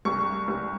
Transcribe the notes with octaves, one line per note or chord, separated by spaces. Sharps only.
C2 C#6
C2